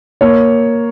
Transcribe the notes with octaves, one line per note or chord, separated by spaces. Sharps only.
A#3 C#5